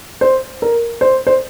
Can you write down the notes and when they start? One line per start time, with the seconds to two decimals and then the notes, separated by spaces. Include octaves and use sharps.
0.21 C5
0.62 A#4
1.01 C5
1.27 C5